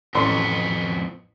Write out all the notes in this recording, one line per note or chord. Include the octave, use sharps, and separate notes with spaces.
A1 F2 B3 C6